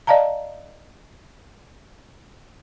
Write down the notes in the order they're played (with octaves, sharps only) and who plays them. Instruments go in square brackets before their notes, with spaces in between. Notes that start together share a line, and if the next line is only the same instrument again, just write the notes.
[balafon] D5 D#5 F5 A5 A#5